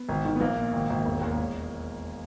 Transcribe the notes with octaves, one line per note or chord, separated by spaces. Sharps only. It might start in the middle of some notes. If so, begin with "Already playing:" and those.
Already playing: B3
G#1
D#3
B3
A#1 A#3
A#2
G#1
G#1
E1
D#2
E1